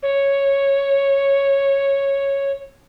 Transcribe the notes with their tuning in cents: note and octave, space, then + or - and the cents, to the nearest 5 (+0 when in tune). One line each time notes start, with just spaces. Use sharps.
C#5 -5